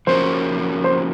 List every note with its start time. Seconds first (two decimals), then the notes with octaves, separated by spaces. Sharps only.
0.07 F3 A#3 C#4 F#4 A#4 C5
0.84 C5